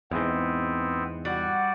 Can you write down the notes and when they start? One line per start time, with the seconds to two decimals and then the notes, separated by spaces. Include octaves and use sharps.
0.11 E2 G#2 B3 C4
1.25 G3 F#4 D5